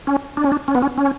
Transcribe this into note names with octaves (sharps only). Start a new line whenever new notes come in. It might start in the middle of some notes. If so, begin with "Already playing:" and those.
C#4
D4
C#4
D4
C#4
B3
C#4
C#4